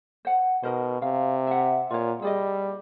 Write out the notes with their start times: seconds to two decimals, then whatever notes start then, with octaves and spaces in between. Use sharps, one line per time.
0.25 C5 F#5
0.63 B2 D#4 A#4 C5
1.02 C3 F5
1.47 E5 F#5
1.90 A#2 F4 C#5
2.22 G3 G#4 D5 D#5